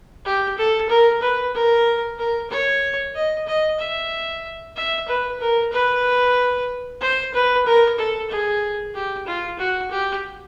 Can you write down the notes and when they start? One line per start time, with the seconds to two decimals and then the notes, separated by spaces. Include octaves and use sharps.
0.25 G4
0.57 A4
0.89 A#4
1.21 B4
1.54 A#4
2.18 A#4
2.50 C#5
3.15 D#5
3.47 D#5
3.79 E5
4.76 E5
5.08 B4
5.40 A#4
5.72 B4
7.01 C5
7.33 B4
7.65 A#4
7.98 A4
8.30 G#4
8.94 G4
9.26 F4
9.58 F#4
9.91 G4